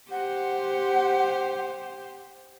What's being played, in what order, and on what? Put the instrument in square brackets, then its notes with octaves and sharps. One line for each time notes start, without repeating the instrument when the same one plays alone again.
[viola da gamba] G4 C5 [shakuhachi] F#5